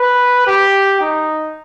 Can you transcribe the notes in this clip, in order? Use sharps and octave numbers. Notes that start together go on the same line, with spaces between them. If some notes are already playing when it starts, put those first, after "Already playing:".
Already playing: B4
G4
D#4